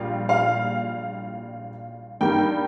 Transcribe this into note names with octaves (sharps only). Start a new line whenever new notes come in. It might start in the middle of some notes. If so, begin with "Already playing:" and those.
Already playing: A#1 A#2 G3 F5
F5
G2 G3 A#3 D#4 G5